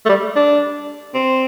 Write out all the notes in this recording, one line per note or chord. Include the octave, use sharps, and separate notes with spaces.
A3
G3
D4
C4